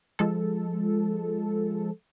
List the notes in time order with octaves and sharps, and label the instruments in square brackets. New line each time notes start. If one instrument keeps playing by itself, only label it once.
[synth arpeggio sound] F3 G#3 A4